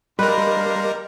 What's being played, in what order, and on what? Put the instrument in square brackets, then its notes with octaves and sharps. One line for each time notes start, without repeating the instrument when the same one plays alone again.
[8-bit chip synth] G3 A#4 [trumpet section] D4 F5 C6 [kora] B4 [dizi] D#5